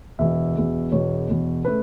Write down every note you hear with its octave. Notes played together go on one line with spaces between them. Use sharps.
E1 E2 B2 E5
E1 E2 B2
E1 E2 B2 B3 C#5
E1 E2 B2 B3
C#3 A3 B4